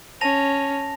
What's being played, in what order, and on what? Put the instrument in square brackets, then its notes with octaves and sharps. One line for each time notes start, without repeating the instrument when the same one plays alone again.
[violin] C#4 [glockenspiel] A5 A#6 F7